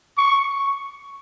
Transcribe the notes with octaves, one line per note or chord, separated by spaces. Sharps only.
C#6